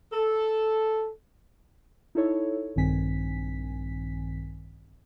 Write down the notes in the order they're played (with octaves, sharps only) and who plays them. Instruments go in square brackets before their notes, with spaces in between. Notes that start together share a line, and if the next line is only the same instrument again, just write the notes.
[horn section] A4
[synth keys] D#4 E4 A4 C#5
A#1 G2 D#3 C4 G#5 B6